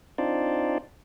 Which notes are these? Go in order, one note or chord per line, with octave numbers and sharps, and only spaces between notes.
C4 D4 D#4 F4 C5 D5